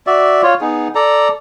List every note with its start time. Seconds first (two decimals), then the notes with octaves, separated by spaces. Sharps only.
0.07 F#4 D5 E5
0.43 F4 C#5
0.61 B3 D#4 G#4
0.95 A4 D5 A#5